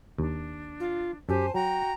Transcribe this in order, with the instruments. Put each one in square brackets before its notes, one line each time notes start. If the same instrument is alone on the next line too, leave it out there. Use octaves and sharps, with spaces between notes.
[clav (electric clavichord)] D#2 [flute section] D4
[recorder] F4
[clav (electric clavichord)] F#2 [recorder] G4 [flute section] C5 G#5 A5
[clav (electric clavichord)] F#3 [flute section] F#4 G5 [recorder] A#5